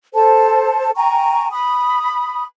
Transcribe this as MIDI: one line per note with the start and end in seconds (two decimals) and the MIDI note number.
0.14 0.90 69
0.14 0.90 72
0.14 0.90 81
0.95 1.50 79
0.95 1.50 80
0.95 1.50 82
0.95 1.50 85
1.51 2.44 83
1.51 2.44 87